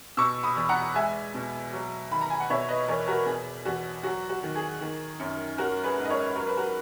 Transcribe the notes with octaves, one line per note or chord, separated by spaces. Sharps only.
B2 C#6 E6
B5 D#6
E2
F#5 A#5
G#3 E5 G#5
B2
F#3
D#3 B5
A#5
G#5
F#5
B2 C#5 E5
B4 D#5
E2 A#4 C#5
F#4 A#4
B2 G#4
E2 F#4
F#3 F#4
F#4
D#3
G#4
D#3
F#2
F#3 F#4 A#4
G#4 B4
G#2
D#5
A#4 C#5
F#3 A#4
B4
F#4 A#4